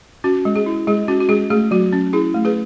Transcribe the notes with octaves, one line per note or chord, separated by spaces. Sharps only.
C#4 F#4
G#3
G#4
E4
G#3 G#4
C#4 F#4
F#4
G#3 G#4
A3 G#4
F#3 F#4
C#4
E4 G#4
A3
G#4 B4